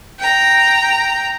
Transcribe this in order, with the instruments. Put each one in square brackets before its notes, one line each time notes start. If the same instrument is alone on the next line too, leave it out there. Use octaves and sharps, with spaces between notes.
[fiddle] G5 A#5